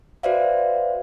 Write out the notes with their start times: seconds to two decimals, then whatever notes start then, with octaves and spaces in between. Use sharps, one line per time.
0.23 F#4 B4 C5 D5 E5 F5